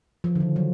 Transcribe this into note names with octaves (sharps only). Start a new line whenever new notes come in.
F3
D3
D#3
F#3